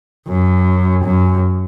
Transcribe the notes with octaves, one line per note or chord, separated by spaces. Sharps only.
F#2
F#2